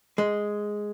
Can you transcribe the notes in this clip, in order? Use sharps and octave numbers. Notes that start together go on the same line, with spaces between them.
G#3